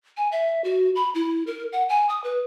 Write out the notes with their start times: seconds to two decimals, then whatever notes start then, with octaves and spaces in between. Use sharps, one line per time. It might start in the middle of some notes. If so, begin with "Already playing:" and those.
0.17 G#5
0.32 E5
0.64 F#4
0.96 B5
1.15 E4
1.47 A#4
1.73 F#5
1.89 G#5
2.09 D#6
2.24 B4